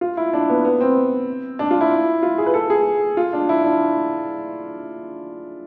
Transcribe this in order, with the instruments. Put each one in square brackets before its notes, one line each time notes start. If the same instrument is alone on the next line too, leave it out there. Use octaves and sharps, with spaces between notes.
[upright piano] F4
E4
D4
B3
B3
C4
D4
F4
E4
F4
G#4
B4
A4
G#4
F4
D4
E4
D4